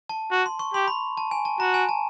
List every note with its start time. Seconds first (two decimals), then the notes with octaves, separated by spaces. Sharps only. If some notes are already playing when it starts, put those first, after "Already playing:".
0.09 A5
0.31 F#4
0.46 C6
0.59 C#6
0.74 G4 C6
0.88 B5
1.17 A5
1.31 G#5
1.45 A5
1.60 F#4 A#5
1.74 G#5
1.89 A5